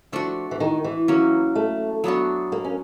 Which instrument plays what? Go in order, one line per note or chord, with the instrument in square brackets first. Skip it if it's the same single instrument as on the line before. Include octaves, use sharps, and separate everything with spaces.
[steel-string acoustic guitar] F3 [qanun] A3 D4 F#4
[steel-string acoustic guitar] E3
D#3
E3
[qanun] F#3 A#3 C#4 F#4
[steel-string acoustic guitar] A3
[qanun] F#3 B3 D4 F#4
[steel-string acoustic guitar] A#3
C#4